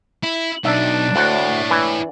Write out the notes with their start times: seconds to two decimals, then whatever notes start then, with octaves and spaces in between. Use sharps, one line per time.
0.23 E4
0.65 B1 D4 D#4 E5
1.16 D2 E4 C#5 F#5
1.71 E3